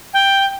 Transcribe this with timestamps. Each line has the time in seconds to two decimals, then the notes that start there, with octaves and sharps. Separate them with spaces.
0.13 G5